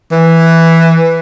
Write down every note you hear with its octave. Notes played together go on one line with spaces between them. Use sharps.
E3